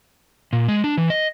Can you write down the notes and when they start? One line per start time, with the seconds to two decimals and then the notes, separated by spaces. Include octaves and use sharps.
0.53 A#2
0.68 G#3
0.84 D4
0.98 E3
1.10 D#5